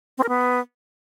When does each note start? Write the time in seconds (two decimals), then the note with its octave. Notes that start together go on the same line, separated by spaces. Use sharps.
0.18 C4
0.23 A#4
0.29 B3